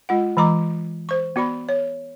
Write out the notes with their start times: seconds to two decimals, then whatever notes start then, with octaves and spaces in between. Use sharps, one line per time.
0.09 G#3 F4 F#5
0.37 E3 G#3 A#5 D6
1.09 C5 C#6
1.36 B3 F#4 D5 B5
1.69 C#5